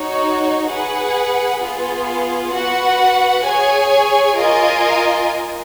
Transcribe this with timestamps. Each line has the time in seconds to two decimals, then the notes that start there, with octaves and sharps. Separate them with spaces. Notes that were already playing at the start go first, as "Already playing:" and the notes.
Already playing: D#4 F#4 C#5
0.72 G#4 B4 F#5
1.63 B3 F4 G#4
2.55 F#4 B4 F#5
3.46 G#4 C#5 G#5
4.38 F4 A#4 D#5 G#5